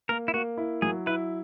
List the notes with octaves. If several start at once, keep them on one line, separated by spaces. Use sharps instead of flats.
A#3 A#4
E4
A#3 F#4
E4
F#3 G#4
E4 B4